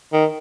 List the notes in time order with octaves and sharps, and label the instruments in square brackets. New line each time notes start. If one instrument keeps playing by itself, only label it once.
[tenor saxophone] D#3